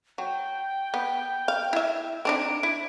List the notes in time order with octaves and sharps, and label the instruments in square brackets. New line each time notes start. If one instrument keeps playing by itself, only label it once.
[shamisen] F#3 [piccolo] G5
[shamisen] B3
F5
E4 E5
[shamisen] C4 D4 D#4 [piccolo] D7
[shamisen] E4